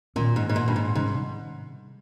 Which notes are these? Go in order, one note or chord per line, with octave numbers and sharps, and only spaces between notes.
A#2 D#3 A#3 C#4
G#2
G#2
A#2
G2
G#2
G#2 C3 D#3 G3 C#4